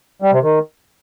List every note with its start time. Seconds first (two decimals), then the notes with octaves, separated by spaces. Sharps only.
0.22 G3
0.33 C3
0.43 D#3